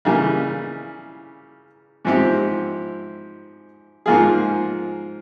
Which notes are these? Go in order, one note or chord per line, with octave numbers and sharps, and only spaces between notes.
C#3 E3 G3 A#3
G#2 F3 C4 E4 G4
G#2 F3 A#3 F4 G#4